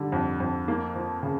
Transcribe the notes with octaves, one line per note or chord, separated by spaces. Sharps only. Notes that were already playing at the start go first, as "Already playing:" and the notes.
Already playing: D3 G3
F2
F2
A#3
F3
C#3